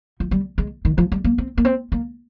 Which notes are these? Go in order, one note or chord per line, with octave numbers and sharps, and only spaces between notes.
F3
G3
G#3
D#3
F3
G3
A#3
C4
A#3
C4
A#3